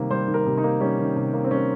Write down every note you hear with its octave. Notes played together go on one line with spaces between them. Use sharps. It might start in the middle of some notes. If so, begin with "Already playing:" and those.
Already playing: C3 D#3 G3 A#3
G3 C5
D#3
A#4
C3
D#4
A#3
G3 C#4
D#3
C3
A#3
C4
G3 C#4